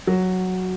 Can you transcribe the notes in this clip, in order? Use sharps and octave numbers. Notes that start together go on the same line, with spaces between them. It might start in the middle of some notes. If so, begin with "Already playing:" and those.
F#3